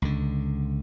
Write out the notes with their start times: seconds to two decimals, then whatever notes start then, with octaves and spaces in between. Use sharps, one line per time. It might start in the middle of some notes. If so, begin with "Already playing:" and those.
0.02 C#2 D3